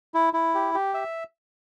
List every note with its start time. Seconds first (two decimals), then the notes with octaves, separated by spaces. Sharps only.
0.14 E4
0.33 E4
0.55 G4
0.74 G4
0.94 E5